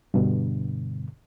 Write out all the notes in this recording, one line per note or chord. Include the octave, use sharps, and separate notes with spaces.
G2 B2 D3